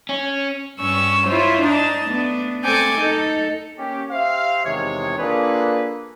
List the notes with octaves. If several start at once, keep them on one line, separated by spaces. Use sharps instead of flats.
C#4
G2 G3 C#4 C#6 E6
E4 F4 C5 C#5
D4 D#4 A5
A3 B3 D4
A3 C4 A4 G#5 D6 G6
D#4 A4
A#3 C#4 G4
G4 C5 E5 F5
E2 C3 D#3 G#3 C#5
A#3 D4 F4 G#4 A4 B4